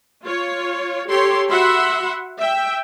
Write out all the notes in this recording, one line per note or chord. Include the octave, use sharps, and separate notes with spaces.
F4 C#5
G4 A4 C#5 C6
F#4 E5 F#5 B5 C6
E5 G5